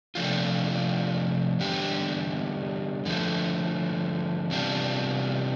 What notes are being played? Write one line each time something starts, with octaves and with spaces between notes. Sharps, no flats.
C3 F3 A3 D4 F4
E2 D3 G3 D4 G4
D3 F3 A3
E2 C3 G3 D4 F4